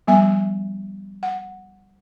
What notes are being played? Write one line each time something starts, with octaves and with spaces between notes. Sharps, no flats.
F3 G3 B3 E5 G#5
F#5